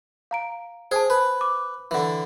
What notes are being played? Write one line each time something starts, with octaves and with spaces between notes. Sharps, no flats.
F5 A#5 D7
G#4 C5 G#5 A5
B4
D6
D3 E3